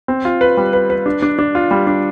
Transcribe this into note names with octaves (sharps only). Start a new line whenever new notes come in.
C4
F4
B4
G3
B4
B4
D4
D4
D4
F4
G3
D4